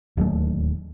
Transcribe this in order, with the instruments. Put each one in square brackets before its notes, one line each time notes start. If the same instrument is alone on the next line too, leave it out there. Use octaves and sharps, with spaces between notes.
[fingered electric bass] D1 D#2 F#3 A3